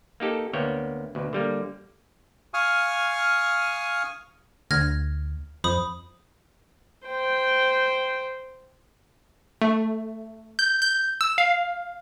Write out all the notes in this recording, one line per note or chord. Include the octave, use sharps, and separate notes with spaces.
A#3 D#4 G4 A4
D2 A#3 B3 C#5 G5
D2 B2
D3 G3 A#3
F5 G#5 C#6 D#6 F6
D2 F6 G#6 A#6
F2 C5 B5 D#6
C5 G5
A3
G6
G6
E6
F5